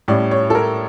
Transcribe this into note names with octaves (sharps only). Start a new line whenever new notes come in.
A2 G3 C#4 D5
C#5
A4
A#4